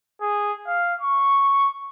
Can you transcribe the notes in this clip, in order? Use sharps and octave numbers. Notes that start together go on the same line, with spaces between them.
G#4
F5
C#6